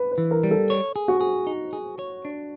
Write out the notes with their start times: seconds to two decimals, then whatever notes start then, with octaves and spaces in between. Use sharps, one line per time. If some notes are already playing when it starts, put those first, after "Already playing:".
Already playing: B4
0.12 B4
0.18 E3
0.31 A#4
0.43 G3
0.51 A4
0.70 C#5
0.96 G#4
1.08 F#4
1.21 G#4
1.47 D#4
1.73 G#4
1.99 C#5
2.25 D4